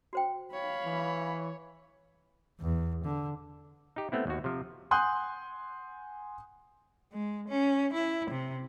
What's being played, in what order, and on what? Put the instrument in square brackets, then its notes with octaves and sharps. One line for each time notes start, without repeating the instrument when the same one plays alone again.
[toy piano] F#4 C5 G5
[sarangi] C#5 [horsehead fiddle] F5 B5
[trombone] E3
[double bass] E2
D3
[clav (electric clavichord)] D#4 G4
A3 B3 C4 E4
D#2 F#4
C3 F3
[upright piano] F#5 G#5 C6 D#6 F#6 G6
[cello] G#3
C#4
E4
C3